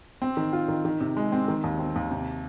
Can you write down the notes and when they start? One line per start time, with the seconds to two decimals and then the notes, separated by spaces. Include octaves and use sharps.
0.22 C4
0.37 D#3
0.53 F4
0.68 D#3
0.85 D#3
1.01 C3
1.17 G#3
1.32 C4
1.48 D#3
1.64 D#2
1.79 C4
1.96 D#2
2.11 C3